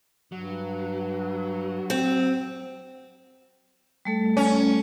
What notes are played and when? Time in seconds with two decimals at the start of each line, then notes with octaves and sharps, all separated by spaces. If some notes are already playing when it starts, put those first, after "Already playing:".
0.32 G2 F#3
1.90 C4
4.05 G3 A3 A4
4.37 C#4